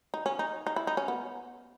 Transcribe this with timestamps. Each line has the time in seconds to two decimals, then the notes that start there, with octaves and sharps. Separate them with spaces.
0.14 D#4
0.26 C#4
0.39 D#4
0.67 D#4
0.76 E4
0.87 D#4
0.97 C#4
1.08 B3